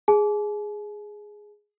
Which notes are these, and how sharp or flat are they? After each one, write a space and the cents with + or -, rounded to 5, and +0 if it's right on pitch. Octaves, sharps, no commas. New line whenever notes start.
G#4 +0 G#5 +45